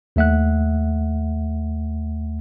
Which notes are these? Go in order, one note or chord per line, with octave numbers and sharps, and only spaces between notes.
D#2 A3 E5 F#5 F#6